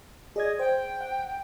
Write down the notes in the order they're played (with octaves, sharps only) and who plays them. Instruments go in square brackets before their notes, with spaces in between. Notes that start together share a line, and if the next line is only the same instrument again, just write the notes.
[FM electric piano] G#4 D5 G#6 [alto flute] D#5
[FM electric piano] C5 [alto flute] G5
[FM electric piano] F#5